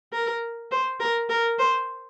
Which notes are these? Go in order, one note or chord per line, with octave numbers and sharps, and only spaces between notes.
A#4
C5
A#4
A#4
C5